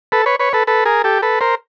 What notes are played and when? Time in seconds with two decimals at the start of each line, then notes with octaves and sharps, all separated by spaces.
0.12 A4 B4
0.26 B4 C#5
0.39 B4 C#5
0.53 A4 B4
0.67 A4 B4
0.85 G#4 A#4
1.04 G4 A4
1.22 A4 B4
1.40 A#4 C5